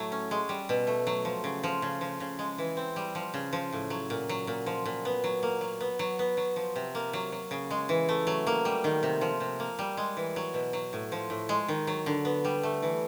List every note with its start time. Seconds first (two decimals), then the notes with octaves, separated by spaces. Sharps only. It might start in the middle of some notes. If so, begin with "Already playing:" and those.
Already playing: A2 F#3 A3
0.12 C#4
0.31 G#3
0.49 G3
0.69 B2
0.87 A3
1.07 F#3
1.25 F3
1.44 C#3
1.63 F3
1.82 C#3
2.01 F3
2.20 C#3
2.39 G#3
2.58 E3
2.77 C4
2.96 G3
3.15 F3
3.34 C#3
3.53 F3
3.73 A2
3.90 F#3
4.10 A#2
4.29 F#3
4.47 A#2
4.66 F3
4.86 A#2
5.05 B3
5.24 F#3
5.43 A#3
5.61 F#3
5.80 B3
5.99 F#3
6.19 B3
6.37 F#3
6.56 F3
6.76 C3
6.95 A#3
7.13 F#3
7.32 F#3
7.51 C#3
7.71 G#3
7.89 E3
8.09 A3
8.27 F#3
8.47 A#3
8.65 G3
8.84 D#3
9.03 C3
9.21 F3
9.40 C3
9.60 A#3
9.79 G3
9.97 G#3
10.17 E3
10.36 F#3
10.54 B2
10.73 F#3
10.93 A2
11.12 F3
11.30 A2
11.49 G#3
11.68 D#3
11.87 F#3
12.06 D3
12.25 B3
12.45 G3
12.63 A3
12.82 E3